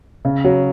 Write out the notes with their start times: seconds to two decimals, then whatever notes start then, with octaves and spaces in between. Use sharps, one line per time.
0.25 C#3
0.44 F#3